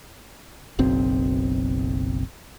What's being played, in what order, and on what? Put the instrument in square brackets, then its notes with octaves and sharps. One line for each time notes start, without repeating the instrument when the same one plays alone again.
[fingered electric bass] F#1 B1 C4